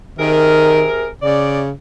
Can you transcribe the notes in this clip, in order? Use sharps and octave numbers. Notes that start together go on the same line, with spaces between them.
C3 D#3 G#4 A#4
C#3 D5